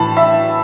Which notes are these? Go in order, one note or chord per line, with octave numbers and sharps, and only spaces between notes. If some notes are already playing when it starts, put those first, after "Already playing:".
Already playing: A2 E3 A5 B5
E5